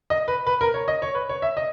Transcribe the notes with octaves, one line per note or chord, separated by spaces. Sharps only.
D#5
B4
B4
A#4
C#5
D#5
C#5
B4
C#5
E5
D#5